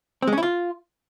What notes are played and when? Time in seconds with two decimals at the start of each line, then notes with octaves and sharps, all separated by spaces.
0.22 C4
0.27 G#3
0.33 C#4
0.38 E4
0.43 F4